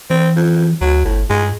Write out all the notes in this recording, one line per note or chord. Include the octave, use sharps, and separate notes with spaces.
E3 C4
F2
D2 F#3
G1 A2
G2 G#3